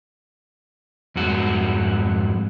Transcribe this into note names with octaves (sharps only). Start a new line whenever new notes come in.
F2 G#2 F#4